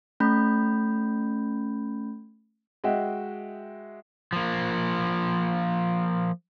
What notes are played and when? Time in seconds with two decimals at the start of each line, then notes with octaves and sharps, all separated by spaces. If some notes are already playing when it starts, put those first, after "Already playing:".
0.20 A3 C#4 B5 G6
2.84 G#3 F#4 E5 G5
4.33 F3 A#3